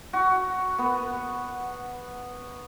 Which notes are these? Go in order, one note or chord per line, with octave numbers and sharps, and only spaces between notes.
F#4
B3